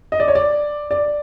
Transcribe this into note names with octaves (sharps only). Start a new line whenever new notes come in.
D#5
D5
C#5
D5
D5